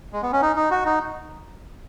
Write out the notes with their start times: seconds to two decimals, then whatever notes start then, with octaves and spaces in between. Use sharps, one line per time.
0.13 G#3
0.23 B3
0.33 C#4
0.42 D#4
0.56 D#4
0.71 F#4
0.86 D#4